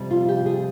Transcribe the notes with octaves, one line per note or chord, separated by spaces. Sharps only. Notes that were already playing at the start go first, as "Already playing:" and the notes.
Already playing: F2 C3 G3
F4
G4
G#4